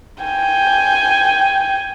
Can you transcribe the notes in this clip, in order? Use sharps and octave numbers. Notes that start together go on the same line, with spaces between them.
G5 G#5